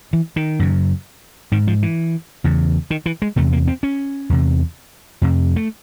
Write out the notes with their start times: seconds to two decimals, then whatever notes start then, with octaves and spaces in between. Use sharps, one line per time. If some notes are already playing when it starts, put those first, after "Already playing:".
0.13 E3
0.36 D#3
0.59 F#2 C#3
1.52 G#2 D#3
1.68 F3
1.83 E3
2.44 E2 C#3
2.90 D#3
3.06 E3
3.22 G#3
3.36 E2 C3 A3
3.53 A#3
3.68 C4
3.83 C#4
4.29 E2 C3
5.22 F2 C3
5.56 A3